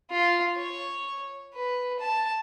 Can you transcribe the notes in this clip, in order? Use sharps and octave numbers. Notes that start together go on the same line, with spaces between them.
F4
C#5
B4
A5